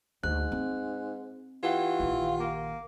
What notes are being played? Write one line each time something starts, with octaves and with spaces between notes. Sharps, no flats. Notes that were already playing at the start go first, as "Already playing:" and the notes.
D2 G#2 F#6
C4
E3 F4 G4 F#5 G5
A#1 D#3
A#3